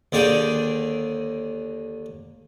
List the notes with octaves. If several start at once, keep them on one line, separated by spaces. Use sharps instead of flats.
D#2 D3 G#4 D5 G5